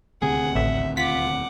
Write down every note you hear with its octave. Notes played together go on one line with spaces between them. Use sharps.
D#1 D2 C3 G#4 F#5
A1 E5
F4 F#5 D6 B6